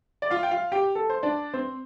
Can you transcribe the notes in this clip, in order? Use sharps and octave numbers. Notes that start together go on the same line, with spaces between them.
D5
F4 F5
G5
F4 F5
G4 G5
A4
C5
D4 D5
C4 C5